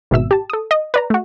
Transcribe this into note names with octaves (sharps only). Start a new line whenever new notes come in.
G#1 B2 E5 E6
G4 A5
A4 D#6
D#5
B4 D5 A#5
A3 F#4